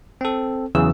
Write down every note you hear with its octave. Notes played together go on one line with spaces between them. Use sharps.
C4 A4
E2 C#3 E3 F#3 G#4 E6